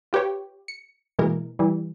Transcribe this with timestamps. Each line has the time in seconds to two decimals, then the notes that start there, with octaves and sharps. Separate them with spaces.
0.13 F4 G4 B4 C#5 G5
0.68 C#7
1.19 B2 E3 G#3 A#3 A#4
1.59 E3 G3